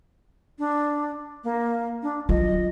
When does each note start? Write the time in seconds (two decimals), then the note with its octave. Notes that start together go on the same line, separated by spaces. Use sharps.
0.59 D4
1.44 A#3
2.03 D4
2.29 F#3 F4 D#5